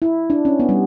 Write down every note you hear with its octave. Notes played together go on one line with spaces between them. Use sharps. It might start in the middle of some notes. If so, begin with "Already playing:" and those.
E4
D4
C#4
B3
G3